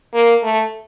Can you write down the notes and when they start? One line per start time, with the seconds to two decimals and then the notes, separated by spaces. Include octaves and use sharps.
0.14 A#3
0.43 A3